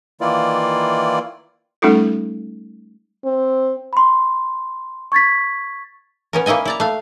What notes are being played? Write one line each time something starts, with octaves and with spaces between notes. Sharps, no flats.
D#3 E3 A#3 E4 F4 D5
G3 A3 C#4 D#4 F4 A4
C4
B5 C6
C#6 G#6 A6 B6
B3 C#4 A#4
A#3 C#4 E4 D#5 G#5
E4 D5 A#5
A3 F5